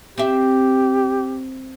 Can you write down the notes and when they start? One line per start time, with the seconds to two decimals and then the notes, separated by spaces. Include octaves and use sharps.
0.18 C4 G4 E5